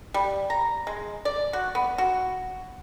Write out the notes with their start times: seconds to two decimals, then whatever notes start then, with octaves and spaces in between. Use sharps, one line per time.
0.14 G3
0.50 A#5
0.87 G#3
1.25 D5
1.53 F#4
1.75 B3
1.98 F#4